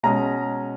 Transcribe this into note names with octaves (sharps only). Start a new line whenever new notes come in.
B2 G#3 C#4 A#5